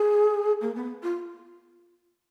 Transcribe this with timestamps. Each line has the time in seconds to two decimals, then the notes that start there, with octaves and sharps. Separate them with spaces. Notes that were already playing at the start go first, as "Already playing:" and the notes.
Already playing: G#4
0.61 A#3
0.75 B3
1.03 F4